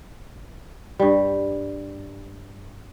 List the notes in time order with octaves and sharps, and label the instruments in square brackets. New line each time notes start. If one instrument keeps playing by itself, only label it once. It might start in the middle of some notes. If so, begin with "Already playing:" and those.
[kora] G2 G3